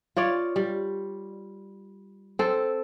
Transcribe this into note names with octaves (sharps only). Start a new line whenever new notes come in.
F4 C#5 D5
G3
C4 A4